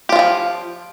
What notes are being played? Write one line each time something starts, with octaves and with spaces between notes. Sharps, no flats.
E3 F3 F4 G4